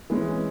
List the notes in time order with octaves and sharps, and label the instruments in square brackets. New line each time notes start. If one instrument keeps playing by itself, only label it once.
[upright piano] E3 G#3 C#4